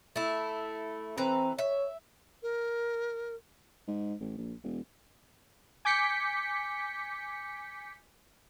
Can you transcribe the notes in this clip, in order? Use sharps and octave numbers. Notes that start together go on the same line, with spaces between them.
A3 E4
E3 C4 B4 A#5
C#5 E5
A#4
G#2
A1
A#1
E1
G#5 D6 G6 B6 C#7